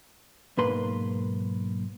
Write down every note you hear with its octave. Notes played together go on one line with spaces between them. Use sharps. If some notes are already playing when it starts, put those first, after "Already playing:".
B1 G#2 A#3 B4 C6